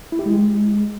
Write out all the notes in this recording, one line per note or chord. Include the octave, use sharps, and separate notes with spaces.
E4
G4
G#3